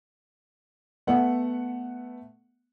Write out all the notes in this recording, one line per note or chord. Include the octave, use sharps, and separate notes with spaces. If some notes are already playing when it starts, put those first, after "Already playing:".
A3 B3 E5 F#5